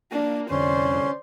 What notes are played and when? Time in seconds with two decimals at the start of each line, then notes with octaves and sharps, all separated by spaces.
0.12 A#3 D4
0.51 C2 F2 D3 C#4 C5 D5 C6